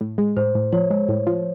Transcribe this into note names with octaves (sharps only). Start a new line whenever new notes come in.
A2
G#3
A2 C5
A2
F3 C#5
G#3
A2
F3